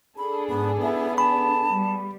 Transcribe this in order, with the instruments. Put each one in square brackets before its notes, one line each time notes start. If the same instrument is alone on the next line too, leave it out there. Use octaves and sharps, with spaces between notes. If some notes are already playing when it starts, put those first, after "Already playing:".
[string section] D4 G#4 A4 [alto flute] B5
[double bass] G#2 [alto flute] B3
[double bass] B3 [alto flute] E4
[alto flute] A5 [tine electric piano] B5
[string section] G3